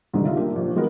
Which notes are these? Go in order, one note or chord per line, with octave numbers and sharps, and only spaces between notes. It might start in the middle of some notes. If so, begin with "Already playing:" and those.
C2 D3 D#3 G#3
D#4 F4 E5
A#3 D4 G4
A#1
D#3 G#3 B3 F#4 A#4